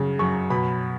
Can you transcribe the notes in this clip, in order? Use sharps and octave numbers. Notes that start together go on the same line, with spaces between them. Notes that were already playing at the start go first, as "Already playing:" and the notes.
Already playing: F#2 C#3
F#2 C#6
B2 B5